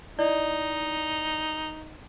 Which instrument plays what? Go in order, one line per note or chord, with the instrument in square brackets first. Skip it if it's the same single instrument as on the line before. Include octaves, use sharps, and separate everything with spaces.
[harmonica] D#4 [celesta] E4 D5 D#5